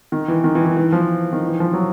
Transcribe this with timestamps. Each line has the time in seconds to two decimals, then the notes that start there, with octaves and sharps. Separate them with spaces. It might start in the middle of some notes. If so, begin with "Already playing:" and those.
0.12 D#3
0.28 E3
0.44 D#3
0.55 E3
0.65 E3
0.77 E3
0.92 F3
1.33 D#3
1.46 E3
1.60 F3
1.73 F#3